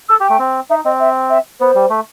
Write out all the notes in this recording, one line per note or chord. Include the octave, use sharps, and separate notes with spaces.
A4 E6
G4
G5
A3
C4
D#4 E5
C4 D#5
E5
E5
B3 C5
G3
A3